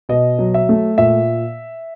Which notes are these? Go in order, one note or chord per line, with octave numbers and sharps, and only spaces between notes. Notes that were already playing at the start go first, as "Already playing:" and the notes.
B2 D#5
F#3
E5
A3
A#2 E5